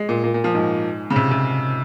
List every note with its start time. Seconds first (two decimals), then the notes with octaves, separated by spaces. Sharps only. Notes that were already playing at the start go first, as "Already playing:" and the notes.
Already playing: G#3
0.09 A#2
0.24 A#2
0.34 A#2
0.44 F3
0.55 G#2
1.10 C#3
1.16 C3
1.31 C3